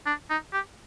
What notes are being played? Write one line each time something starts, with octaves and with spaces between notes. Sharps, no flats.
D4
D#4
G4